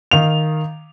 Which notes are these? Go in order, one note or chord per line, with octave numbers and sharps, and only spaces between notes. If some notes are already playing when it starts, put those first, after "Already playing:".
D#3 F5 F7